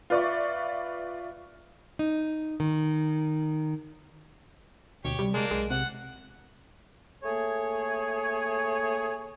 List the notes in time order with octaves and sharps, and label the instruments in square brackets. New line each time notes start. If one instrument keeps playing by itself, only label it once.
[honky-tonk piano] F4 B4 D5 E5 C#6
[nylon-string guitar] D#4
D#3
[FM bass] D2 [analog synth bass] B2 [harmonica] G4 C#5
[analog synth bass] C3 [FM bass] G3
[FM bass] G#3 [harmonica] A#3 D4
[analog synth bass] B1 [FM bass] G#3
[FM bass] C3 [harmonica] F#5
[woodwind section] A3 A#3 G#4 C#5